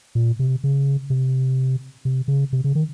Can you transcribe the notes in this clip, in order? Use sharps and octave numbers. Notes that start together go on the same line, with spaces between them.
A#2
C3
C#3
C3
C3
C#3
C3
C#3
D#3